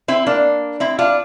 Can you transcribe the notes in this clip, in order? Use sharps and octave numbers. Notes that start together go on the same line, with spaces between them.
C4 E4
A#3 D4
C4 E4
D4 F4